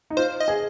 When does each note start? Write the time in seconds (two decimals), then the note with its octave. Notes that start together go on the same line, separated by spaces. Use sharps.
0.10 D#4
0.17 F4 C5
0.40 D#5
0.48 G#4